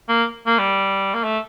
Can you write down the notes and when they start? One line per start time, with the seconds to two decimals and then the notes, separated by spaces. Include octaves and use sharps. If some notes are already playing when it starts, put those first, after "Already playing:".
0.09 A#3
0.46 A#3
0.59 G3
1.14 A#3
1.24 A3